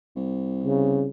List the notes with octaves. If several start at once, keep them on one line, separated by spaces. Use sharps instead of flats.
C2
C#3